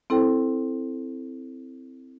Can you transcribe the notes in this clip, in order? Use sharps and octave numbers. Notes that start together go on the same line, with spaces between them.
C4 E4 A4 C5 G5